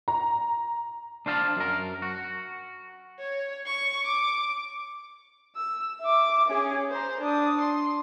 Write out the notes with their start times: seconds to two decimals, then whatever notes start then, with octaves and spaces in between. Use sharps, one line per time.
0.08 A#5
1.26 D4 C5 F5 A5
1.56 F#2 A#4
2.02 F#4
3.19 C#5
3.66 C#6
4.06 D6
5.56 E6
6.01 E5 D6
6.49 C#4 G#4
6.90 C5 A#5
7.21 D4 D#6
7.61 C6